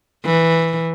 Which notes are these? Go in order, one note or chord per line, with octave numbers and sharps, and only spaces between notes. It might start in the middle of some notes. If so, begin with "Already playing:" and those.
E3